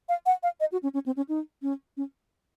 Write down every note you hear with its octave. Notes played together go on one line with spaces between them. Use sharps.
F5
F#5
F5
D#5
F#4
C#4
C#4
C4
C#4
D#4
C#4
C#4